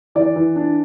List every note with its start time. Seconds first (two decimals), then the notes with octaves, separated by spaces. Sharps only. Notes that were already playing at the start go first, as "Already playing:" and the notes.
0.15 E3 D5
0.36 E3
0.56 D4